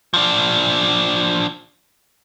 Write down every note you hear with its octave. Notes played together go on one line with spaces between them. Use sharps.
F3 D4